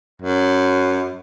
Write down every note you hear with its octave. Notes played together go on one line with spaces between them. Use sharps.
F#2